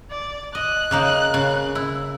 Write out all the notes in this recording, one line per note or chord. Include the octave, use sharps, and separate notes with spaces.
D5
D#5 F#6
C#3 A#3 D#4
C#3
E4